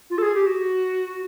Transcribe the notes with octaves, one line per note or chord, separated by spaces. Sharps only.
F4
A4
G#4
G4
F#4